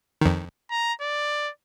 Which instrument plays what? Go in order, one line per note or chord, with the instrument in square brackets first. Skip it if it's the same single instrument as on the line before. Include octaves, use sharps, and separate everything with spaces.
[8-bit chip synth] F2 D#3
[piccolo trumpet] A#5
D5